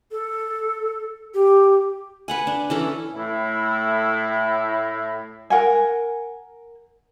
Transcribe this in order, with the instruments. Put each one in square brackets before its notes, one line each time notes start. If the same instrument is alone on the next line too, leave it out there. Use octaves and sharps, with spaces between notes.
[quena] A4
G4
[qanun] B4 F#5 G#5
D4
E3 C#4 A4
[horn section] A2 E4
[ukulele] A#4 F#5 G#5